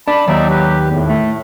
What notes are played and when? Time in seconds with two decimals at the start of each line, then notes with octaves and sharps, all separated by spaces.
0.08 D4 A5 B5
0.28 D#2 F#3 D#4 D5 E5
0.50 G4 B4
0.90 E2 A2
1.08 A3